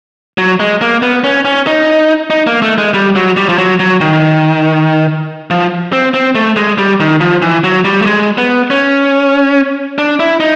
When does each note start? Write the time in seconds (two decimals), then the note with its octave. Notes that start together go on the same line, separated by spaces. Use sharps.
0.38 F#3
0.60 G#3
0.81 A#3
1.02 B3
1.24 C#4
1.45 C#4
1.67 D#4
2.30 D#4
2.47 A#3
2.62 A3
2.78 G#3
2.94 G3
3.16 F#3
3.37 G3
3.49 F3
3.58 F#3
3.80 F#3
4.01 D#3
5.50 F3
5.93 C4
6.14 C4
6.35 A3
6.56 G#3
6.78 G3
7.00 D#3
7.21 F3
7.42 E3
7.64 F#3
7.85 G3
8.02 A3
8.06 G#3
8.38 B3
8.70 C#4
9.98 D4
10.20 E4
10.40 D#4